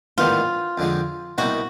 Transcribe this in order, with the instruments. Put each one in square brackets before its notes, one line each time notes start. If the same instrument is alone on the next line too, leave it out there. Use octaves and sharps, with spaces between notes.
[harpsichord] A1 G#2 D#3 G3 B3 [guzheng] F4
[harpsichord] F2 D3 F3 G#3
[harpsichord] C2 B2 G3 A#3 D#4 [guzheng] F#4